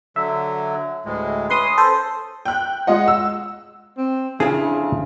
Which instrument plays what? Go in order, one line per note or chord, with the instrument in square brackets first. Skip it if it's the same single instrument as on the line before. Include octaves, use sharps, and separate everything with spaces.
[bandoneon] D3 F#3 [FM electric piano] E5
[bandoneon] D2 A2 G#3
[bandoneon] C#4 [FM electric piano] B4 C6 D#6
[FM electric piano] A4 C5
[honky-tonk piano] G5 F#6
G#3 F4 D#5 F#5
E6
[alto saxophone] C4
[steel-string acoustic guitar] F2 C#3 [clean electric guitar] D4 G#5 [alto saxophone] E4 [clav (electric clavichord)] G#4